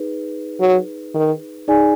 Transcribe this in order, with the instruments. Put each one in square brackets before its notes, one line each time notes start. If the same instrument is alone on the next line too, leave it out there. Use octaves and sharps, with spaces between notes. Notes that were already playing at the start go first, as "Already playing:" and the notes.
Already playing: [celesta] D#4 G#4 B4
[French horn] F#3
D#3
[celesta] D#4 G#4 D5 G#5